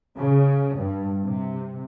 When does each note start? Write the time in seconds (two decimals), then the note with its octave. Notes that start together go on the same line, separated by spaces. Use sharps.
0.18 C#3
0.79 G2
1.24 C3